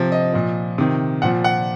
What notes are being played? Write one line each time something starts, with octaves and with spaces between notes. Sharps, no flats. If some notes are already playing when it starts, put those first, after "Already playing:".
Already playing: C3 F3
D#5
A#2 F3
C3 D#3
A#2 F3 F#5
F#5